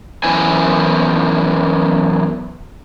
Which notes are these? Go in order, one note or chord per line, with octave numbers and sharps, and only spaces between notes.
F#2 E3 B3 E4 C5 G#5